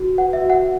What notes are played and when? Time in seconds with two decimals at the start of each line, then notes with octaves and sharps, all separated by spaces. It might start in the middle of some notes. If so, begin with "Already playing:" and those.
Already playing: F#4
0.17 B4 F#5
0.33 E5
0.41 F#4
0.50 F#5